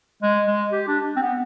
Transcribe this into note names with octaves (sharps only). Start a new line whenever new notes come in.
G#3
G#3
G4
D4
C4
B3